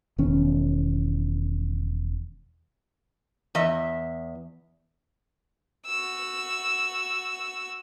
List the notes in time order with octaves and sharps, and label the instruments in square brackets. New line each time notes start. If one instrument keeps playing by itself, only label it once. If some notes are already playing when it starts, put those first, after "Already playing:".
[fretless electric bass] E1 D#3 C#4
[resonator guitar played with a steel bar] E2 D#5 E5
[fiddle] F#4 E6